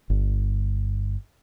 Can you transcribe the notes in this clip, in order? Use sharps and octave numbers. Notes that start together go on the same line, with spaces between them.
G1